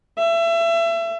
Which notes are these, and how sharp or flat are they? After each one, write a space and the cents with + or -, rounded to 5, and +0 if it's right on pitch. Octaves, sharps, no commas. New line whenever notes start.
E5 +30